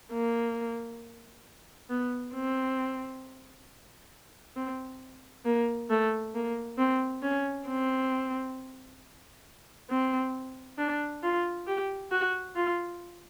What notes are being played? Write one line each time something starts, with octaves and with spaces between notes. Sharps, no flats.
A#3
B3
C4
C4
A#3
A3
A#3
C4
C#4
C4
C4
D4
F4
G4
F#4
F4